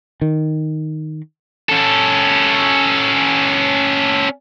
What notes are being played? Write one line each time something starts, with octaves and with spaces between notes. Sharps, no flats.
D#3
C#4 A4